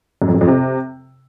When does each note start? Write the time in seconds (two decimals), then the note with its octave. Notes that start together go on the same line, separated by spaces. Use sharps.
0.22 F#2
0.28 F2
0.35 F#2
0.41 F2
0.48 C3